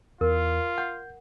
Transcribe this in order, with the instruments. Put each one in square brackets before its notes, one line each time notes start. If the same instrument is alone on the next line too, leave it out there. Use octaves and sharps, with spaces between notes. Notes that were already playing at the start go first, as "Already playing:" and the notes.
[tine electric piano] E2 [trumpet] F4 [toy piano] A#4
[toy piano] F#5 [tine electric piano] G6